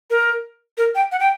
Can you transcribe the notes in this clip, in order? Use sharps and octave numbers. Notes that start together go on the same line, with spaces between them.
A#4
A#4
G5
F#5
G5